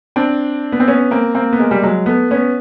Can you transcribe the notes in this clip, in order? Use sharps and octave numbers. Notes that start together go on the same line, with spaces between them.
C4 D4
B3
C4
B3 C#4
A#3 C4
A#3 C4
B3
G#3 A#3
G3
F#3 G#3
A3 B3
B3 C#4